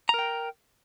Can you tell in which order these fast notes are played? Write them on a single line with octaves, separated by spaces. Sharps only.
A#5 A#4 G5